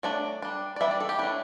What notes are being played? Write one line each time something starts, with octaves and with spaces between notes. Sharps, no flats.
F#3 A3 D4 D5
G3 D4
D5
E3 G3 D4 E5
D5
A4
G4
F#3 A3 D4 E4